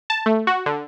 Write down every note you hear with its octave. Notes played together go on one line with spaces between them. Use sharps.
A5
A3
F#4
D3